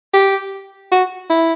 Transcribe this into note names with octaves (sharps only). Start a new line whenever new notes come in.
G4
F#4
E4